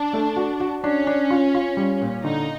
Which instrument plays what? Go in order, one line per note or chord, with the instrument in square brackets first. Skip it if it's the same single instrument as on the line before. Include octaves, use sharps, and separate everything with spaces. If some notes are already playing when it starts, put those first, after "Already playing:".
Already playing: [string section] D4
[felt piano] A3
F#4
F#4
[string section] C#4 [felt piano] D4
[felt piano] D4
F4
F4
G3
A#2
[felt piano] D3 [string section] D#4